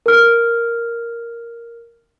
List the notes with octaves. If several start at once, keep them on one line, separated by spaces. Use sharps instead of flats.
A#4 F6